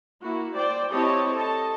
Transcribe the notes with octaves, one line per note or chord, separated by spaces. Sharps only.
A#3 E4 F#4
C5 D5 G5
C4 E4 G4 C#5 D#5 A5
A4 D#5 A5